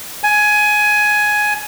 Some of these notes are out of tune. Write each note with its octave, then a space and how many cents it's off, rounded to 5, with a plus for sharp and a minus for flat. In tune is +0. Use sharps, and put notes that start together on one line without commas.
G#5 +15